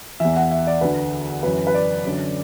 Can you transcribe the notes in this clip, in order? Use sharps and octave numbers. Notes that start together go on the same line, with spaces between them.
E2 E3 E5
F#5
E5
D5
D2 D3 B4
F#2 E3 B4
B4
D5
F#2 D3